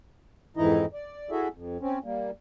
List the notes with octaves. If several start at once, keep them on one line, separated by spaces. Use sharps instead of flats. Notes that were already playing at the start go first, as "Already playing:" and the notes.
F2 G#2 E3 D#4 E4 D#5
D5
E4 F#4 G#4 A4 E5
F2
C4 C#4
G3 A#3